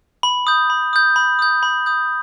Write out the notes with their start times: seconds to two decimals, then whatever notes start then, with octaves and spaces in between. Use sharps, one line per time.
0.23 B5
0.47 D#6 G6
0.70 B5
0.93 D#6 G6
1.16 B5
1.39 D#6 G6
1.63 B5
1.86 D#6 G6